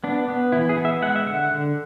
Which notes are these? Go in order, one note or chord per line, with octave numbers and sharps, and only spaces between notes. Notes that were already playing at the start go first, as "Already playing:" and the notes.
B3 D4
B3
E3 E4
G#4
B3
E5
G#3 F#5
E5
D3 F#5
D3